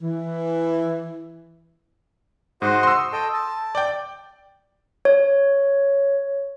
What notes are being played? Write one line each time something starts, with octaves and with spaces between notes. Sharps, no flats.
E3
G#2 F#4 C5 D#5
C6 E6
A4 D#5 G5
A5
D5 G5 G6
C#5